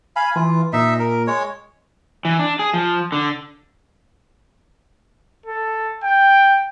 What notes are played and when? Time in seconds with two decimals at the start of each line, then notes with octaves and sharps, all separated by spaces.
0.16 F5 G#5 B5
0.36 E3 F4
0.73 A#2 D#4 E5
0.99 A#4
1.27 G#3 C#5
2.25 E3
2.39 D4
2.59 G#4
2.74 F3
3.12 D3
5.46 A4
6.04 G5